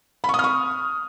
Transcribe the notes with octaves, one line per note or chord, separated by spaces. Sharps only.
B5
C#6
D#6
F6
C#6